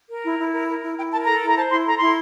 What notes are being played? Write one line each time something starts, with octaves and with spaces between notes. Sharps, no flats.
A#4
E4
E4
A#4
A#4
E4
E4 G5
A#4 A5
A4 A#5
E4
A#5
C5 A5
E4 C6
A4 A#5
E4 C6